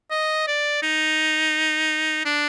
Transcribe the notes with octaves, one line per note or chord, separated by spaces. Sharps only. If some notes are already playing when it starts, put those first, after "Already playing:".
D#5
D5
D#4
D4